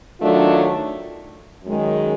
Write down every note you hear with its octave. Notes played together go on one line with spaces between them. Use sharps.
D#3 F#3 A3 D4 F4
F#2 D#3 G#3 C#4